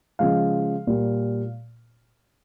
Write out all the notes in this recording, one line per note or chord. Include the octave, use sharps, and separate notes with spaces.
C#3 F3 G#3 F5
A#2 G3 A#3